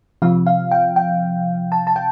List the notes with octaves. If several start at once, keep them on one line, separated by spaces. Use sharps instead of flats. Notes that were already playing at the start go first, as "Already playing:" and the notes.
C3 F3 F5
F5
G5
G5
A5
A5
G5